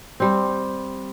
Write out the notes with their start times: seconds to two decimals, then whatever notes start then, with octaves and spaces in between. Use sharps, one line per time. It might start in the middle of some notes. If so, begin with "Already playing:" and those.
0.20 G3 C4